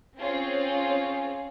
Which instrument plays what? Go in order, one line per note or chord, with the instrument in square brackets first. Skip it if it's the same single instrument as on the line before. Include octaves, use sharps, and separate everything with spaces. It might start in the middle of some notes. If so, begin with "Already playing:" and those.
[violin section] C4 C#4 F4 G#4 C#5